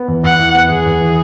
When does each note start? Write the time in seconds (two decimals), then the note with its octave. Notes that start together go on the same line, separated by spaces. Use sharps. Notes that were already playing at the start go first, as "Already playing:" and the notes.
Already playing: B3
0.08 E2
0.23 E2 F#5
0.39 E3
0.54 B3
0.70 E2 G#4
0.86 E2
1.01 E3